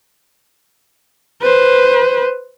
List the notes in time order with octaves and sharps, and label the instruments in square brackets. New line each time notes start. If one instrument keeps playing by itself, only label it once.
[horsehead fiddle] B4 C5